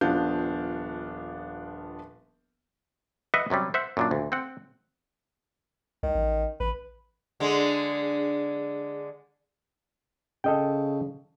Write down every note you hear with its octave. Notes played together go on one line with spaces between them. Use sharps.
D#1 F3 B3 D4 F5 G6
B4 D#5 E5 F#5
F#2 C3 F#3 G3
C5 E5 F#5
F#2 A#2 D4
D2
C4 F#5
C2 D#3
A1
A1 B4
D3 G#3
C#3 A4 D#5 G5